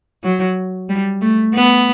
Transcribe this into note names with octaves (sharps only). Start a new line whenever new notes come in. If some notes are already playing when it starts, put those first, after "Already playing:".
F#3
G3
A3
B3